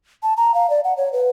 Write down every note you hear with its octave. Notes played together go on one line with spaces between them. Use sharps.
A5
A#5
F5
D5
F#5
C#5
B4